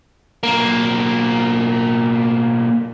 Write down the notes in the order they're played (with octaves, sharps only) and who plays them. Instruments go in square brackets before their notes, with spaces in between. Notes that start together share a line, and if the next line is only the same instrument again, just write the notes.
[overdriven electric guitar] B1 A#3